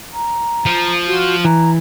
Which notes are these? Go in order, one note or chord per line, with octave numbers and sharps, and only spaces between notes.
A#5
F3
F#4
E3 A#5